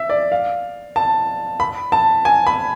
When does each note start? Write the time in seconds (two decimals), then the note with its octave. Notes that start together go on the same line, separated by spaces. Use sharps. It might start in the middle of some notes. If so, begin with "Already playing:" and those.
Already playing: E5
0.09 D5
0.32 F5
0.96 A5
1.60 B5
1.92 A5
2.25 G#5
2.47 B5